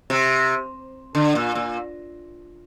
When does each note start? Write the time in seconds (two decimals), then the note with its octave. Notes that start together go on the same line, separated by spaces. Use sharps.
0.10 C3
1.15 D3
1.35 A#2
1.55 A#2